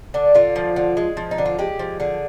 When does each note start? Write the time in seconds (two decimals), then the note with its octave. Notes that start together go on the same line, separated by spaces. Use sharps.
0.14 D3 D4
0.35 D3 F4
0.56 F3
0.76 D3
0.97 G#3
1.17 F3
1.31 D#4
1.38 D3
1.46 F4
1.59 G#3 G4
1.79 F3
2.00 D3 G#4